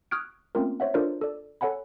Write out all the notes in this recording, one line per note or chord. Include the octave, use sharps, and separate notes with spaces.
C#6 D#6 F6 F#6 G#6 D7
A3 A#3 C4 C#4 F4 A#4
C5 C#5 E5 F#5
D4 F4 A4 A#4 C5 D5
A4 D5
A4 C#5 F#5 G#5 B5